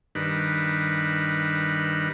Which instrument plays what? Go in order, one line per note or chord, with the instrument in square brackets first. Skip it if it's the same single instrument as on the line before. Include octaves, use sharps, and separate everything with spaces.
[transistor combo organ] G2 D#3 B4